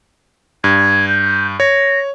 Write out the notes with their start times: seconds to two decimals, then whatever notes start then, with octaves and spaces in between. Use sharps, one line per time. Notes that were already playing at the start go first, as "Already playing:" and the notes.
0.64 G2 G#6
1.08 G6
1.60 C#5 A#6